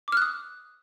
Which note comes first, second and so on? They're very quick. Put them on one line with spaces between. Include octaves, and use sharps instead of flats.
D6 F6 F#6 D#6